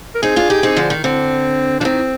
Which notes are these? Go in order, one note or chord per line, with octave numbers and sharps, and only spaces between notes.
A#4
C4 D#4 G#4
D4 F4
D#4 G4
C4 D#4
D3 F3
D#3
D3 C4
F3 D4
D#3 C4